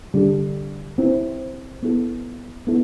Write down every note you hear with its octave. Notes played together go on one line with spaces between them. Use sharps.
D3 G3 D4 A4
C4 E4 B4
B3 E4 A4
B3 E4 A4